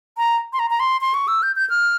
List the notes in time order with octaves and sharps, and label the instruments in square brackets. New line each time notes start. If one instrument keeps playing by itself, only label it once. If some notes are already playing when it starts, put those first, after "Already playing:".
[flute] A#5
C6
A#5
A#5
C6
C6
C#6
E6
G6
G6
F6